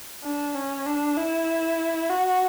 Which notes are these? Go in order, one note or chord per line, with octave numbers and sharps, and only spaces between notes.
D4
C#4
D4
E4
F#4